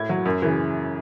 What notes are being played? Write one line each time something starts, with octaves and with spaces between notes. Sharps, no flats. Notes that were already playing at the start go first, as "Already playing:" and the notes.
Already playing: A2 G#6
F#3
F#2
C#3 E3